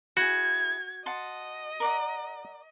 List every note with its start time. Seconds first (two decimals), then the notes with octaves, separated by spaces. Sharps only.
0.17 E4 F#4 G#4 G#6
1.06 D#5 F#5 A5 C6
1.80 A#4 D5 F#5